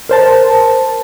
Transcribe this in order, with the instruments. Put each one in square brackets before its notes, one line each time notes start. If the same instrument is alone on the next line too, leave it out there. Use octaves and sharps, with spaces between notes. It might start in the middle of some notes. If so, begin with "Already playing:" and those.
[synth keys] A#4 C5 A5